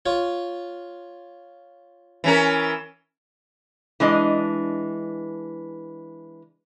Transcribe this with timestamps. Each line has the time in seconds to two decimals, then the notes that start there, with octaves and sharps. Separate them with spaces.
0.06 F4 C#5
2.24 E3 C#4 A#4
4.00 E3 G#3 D4 D#5